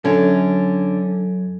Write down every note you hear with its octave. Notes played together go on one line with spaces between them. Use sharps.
F#2 D3 C#4